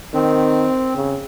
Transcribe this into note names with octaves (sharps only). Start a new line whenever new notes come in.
D#3 C4
C#3